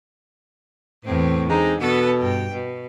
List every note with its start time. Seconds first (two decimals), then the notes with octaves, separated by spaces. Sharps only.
1.04 E2 A2 C4
1.49 D3 G#3 C4 D#4
1.80 B2 B3 A4
2.21 G2 G5
2.53 B2